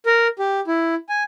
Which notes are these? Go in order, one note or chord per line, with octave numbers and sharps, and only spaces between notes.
A#4
G4
E4
G#5